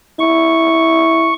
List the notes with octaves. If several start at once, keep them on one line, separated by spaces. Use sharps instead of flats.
E4 C#6